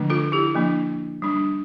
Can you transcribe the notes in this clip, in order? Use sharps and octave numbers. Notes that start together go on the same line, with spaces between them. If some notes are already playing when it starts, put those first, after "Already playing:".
Already playing: D3 F3 A3 D4
F4 A4
E4 G4
F3 A#3 D4
G3 D4